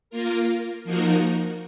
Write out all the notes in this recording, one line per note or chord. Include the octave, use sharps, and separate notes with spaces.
A#3 F4 A#4
F3 A#3 D#4 F#4 A#4